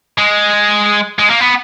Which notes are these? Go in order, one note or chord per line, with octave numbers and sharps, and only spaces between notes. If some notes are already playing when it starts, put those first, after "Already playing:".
G#3
G#3
A#3
B3